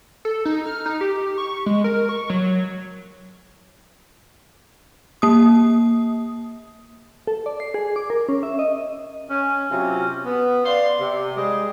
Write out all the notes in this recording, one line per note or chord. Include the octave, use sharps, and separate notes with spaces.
A4
D#4
F6
D#4
G4
C#6
G#3
A#4
C#6
F#3
A#3 D#6
A4
D5
C7
G#4
D6
A#4
C#4
E5
D#5
C#4
C3 F#3 C#4 F4
B3
D5 F5 C6
C3
G3 G#3 G4 G#4